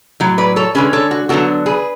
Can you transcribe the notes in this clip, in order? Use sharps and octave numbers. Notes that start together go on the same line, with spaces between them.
A2 F#3
B4 D5
A4 C#5
D3 G#3 C#4 G#4 B4
A4 C#5
F#4
D3 F#3 B3 D4 F#4 A4
G#4 B4